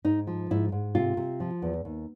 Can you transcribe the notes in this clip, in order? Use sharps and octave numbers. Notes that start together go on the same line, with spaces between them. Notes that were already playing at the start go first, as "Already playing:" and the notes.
G#2 D#4
F3
G#2 E4
G#2
C3 F4
C3
F3
E2
D#2